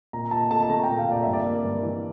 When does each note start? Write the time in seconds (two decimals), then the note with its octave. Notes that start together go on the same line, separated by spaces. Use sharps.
0.13 A#2 A#5
0.31 A#2 A5
0.51 A3 A5
0.63 A5
0.70 A3 A#5
0.84 G5
0.89 A#2
0.98 F5
1.08 A#2 D5
1.23 G2 E5
1.33 D5
1.46 A#3
1.65 G2
1.83 E3